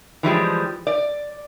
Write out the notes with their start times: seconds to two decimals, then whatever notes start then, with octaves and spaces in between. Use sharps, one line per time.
0.23 E3 F3 G3 G#3
0.87 D5